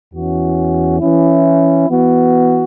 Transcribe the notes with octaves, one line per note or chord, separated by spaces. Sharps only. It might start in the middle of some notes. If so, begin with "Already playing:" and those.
E2 E3 C#4 F#4
E3 C#4 E4
E3 B3 F#4